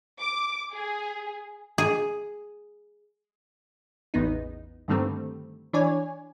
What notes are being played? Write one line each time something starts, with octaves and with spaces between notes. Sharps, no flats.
D6
G#4
G#4
A1 E2 B3 D#4
G2 D3 D#3 G3 A3 C4
E3 D4 C#5 D5 G#5